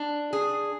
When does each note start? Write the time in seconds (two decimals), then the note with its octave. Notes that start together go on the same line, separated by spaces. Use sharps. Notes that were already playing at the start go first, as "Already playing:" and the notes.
Already playing: D4
0.33 G#4